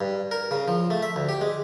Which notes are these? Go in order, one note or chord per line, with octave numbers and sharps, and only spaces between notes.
G2
A#4
C#3
F3
A3
E5
D2
G4
G#3